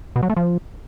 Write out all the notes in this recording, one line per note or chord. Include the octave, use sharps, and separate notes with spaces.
B2
F#3
A3
F3